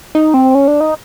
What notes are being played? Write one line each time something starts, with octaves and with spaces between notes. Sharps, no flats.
D#4
C4
C#4
D4
D#4